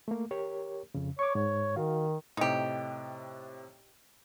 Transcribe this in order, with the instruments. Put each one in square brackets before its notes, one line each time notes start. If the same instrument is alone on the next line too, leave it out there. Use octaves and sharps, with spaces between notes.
[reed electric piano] A3 A#3
G4 A#4 C#5
F2 C#3
[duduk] C#5 [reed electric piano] C#6 D6
[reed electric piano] G#2 [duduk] C#5
[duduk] D#3 [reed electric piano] F#4 F5
[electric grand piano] A2 C3 [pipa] D#4 G4